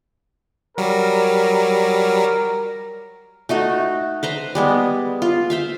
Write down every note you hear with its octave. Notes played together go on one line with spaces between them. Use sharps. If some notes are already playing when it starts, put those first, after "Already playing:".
F#3 G3 A#4
A3 D#4 F#4
B4 C5 A#5
G3 G#3 B3
F4
C5 E5 F5